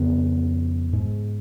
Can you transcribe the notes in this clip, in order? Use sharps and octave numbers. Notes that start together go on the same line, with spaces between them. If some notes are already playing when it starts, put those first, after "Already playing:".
Already playing: F2 C#3 B3
G#2